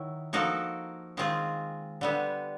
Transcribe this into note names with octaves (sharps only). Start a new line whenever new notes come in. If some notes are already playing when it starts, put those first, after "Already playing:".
Already playing: D#3 F#3 E4
F3 A#3 D#4 F#4 A4
D#3 G#3 C4 F4 G#4
D3 G3 B3